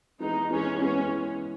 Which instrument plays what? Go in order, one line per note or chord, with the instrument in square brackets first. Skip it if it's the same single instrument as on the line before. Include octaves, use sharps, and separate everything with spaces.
[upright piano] E3 G#3 B3 [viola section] D#4
[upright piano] E3 G#3 B3 [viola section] C#4
[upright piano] E3 G#3 B3 [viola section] C#4